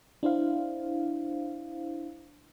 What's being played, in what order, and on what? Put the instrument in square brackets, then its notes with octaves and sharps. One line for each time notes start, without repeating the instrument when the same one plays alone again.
[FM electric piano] D4 E4 C5 F5